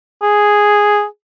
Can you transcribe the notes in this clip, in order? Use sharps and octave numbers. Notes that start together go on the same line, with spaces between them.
G#4